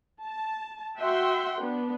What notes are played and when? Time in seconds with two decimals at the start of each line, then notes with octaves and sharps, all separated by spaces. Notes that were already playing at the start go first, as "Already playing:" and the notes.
0.24 A5
0.99 F#4 E5 F#5 G5 C6
1.60 B3 D4